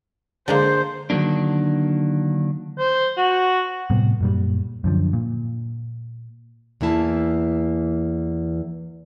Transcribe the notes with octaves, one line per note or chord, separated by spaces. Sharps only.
D3 G#3 A#3 C5
D3 D#3 F#3 A#3 D4
C5
F#4
A2 C3 G3 B3
F#2 A#2 G3
F#2 D3 F3
A#2
E2 E3 A#3 E4 A5